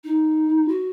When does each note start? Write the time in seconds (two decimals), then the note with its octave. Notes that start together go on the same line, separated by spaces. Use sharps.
0.04 D#4
0.68 F#4